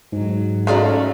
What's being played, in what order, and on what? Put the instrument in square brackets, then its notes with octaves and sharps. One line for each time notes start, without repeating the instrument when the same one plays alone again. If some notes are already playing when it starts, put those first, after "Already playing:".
[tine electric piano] G#2 [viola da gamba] F#3
[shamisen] G#3 C#4 F4 [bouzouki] A3 D5 A#5 [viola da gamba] F#4